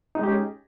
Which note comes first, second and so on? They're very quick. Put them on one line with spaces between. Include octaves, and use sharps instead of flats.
D#4 G#3 G4 C#4 G#4